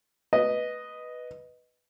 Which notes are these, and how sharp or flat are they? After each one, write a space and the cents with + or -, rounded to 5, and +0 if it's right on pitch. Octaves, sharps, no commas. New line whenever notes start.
B4 +0 D#5 +0